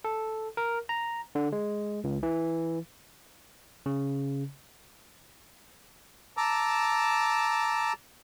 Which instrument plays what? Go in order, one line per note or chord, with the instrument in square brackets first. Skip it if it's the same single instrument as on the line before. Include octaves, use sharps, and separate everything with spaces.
[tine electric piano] A4
A#4
A#5
D3
G#3
C#2
E3
C#3
[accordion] A5 A#5 D6 E6